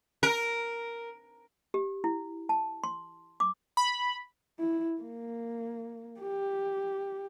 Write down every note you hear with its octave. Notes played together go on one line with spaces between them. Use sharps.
A#4
G4
E4
A5
C6
D6
B5
E4
A#3
G4